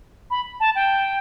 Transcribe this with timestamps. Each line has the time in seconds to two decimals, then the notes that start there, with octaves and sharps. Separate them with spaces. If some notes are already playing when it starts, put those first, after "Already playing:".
0.31 B5
0.60 A5
0.75 G5